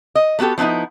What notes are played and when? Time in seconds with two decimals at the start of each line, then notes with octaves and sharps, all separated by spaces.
0.15 D#5
0.39 A3 B3 F#4 G4 A4
0.58 F3 B3 C#4 D#4 E4